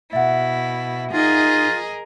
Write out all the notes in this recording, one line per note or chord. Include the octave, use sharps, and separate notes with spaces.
B2 E4 E5 F#5
D#4 F4 G#4 A#4 D#5